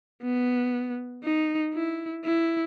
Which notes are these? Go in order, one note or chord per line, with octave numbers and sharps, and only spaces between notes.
B3
D#4
E4
E4